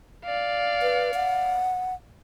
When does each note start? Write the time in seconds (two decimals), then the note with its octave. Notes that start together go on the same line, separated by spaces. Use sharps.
0.25 D5 F5
0.82 B4
1.14 F#5